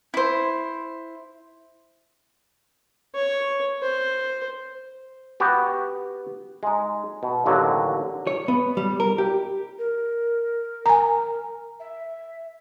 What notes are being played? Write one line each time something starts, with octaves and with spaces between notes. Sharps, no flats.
E4 C5
C#5
C5
B3 F#4 G4
G#3 D#4
B2
A1 D#2 D3 F#3
C#5
B3
G3
A#4
G4
A#4
G#5 A#5
E5